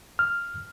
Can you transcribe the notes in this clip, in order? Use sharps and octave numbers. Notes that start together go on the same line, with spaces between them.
F6